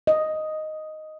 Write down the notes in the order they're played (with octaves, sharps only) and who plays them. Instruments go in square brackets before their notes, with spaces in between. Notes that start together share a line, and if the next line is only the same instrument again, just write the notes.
[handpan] D#5